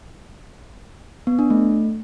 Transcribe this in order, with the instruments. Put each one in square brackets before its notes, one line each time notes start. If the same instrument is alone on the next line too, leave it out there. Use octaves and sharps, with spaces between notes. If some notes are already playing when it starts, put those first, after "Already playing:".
[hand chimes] B3
D4
A3